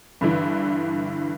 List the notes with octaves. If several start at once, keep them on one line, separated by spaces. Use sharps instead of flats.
G2 D3 E3